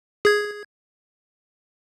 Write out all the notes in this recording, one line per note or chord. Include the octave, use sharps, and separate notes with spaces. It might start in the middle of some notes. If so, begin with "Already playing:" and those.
G#4 G#6